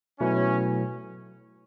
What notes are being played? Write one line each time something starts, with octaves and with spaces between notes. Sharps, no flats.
B2 F#3 A3 C#4 E4 B4